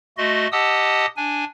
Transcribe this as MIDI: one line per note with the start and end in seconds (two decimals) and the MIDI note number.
0.18 0.47 57
0.18 0.47 66
0.18 0.47 75
0.18 0.47 84
0.52 1.06 67
0.52 1.06 75
0.52 1.06 78
0.52 1.06 81
0.52 1.06 87
0.52 1.06 88
1.17 1.45 62
1.17 1.45 80